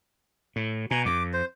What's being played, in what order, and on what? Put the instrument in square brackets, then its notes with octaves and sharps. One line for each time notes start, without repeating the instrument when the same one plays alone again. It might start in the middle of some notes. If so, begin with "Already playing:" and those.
[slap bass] A2
[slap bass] B2 [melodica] G#5 A#5
[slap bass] F2 [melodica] D6
[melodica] C5